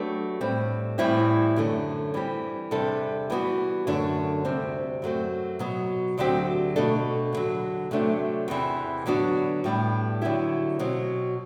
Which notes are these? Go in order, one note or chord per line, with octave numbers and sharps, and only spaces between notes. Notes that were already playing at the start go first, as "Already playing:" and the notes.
Already playing: F#3 A3 D4 G4 B4
A2 G3 C4
A2 E3 G3 C4 E4
F#2 D3 A3
E3 G3 C4 G4
E2 C3 G3 D4 A4
E3 G3 B3 F#4
F#2 D3 A3 D4
D2 C3 G3 C4
F#2 F#3 A3 C4
B2 F#3 B3
D2 D3 F#3 C4 G4
B2 A3 D4 A4
E2 D3 F#3
C3 F#3 A3 D4
E2 C3 E3
D3 F#3 B3 D4 F#4
A2 G3 B3 D4
D3 F#3 B3 E4 G4
B2 F#3 C4